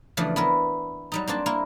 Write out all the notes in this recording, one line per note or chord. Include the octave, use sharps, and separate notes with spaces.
C#3 E3 F3 A3 D4
B3 E4 A#4
F#3 G3 D#4
A#3 C4 D4 A5
A#3 E4 A#4